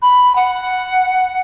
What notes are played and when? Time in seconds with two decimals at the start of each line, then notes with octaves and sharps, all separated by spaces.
0.02 B5
0.36 F#5